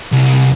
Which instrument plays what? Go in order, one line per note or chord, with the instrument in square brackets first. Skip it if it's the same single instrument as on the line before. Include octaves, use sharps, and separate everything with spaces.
[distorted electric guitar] C2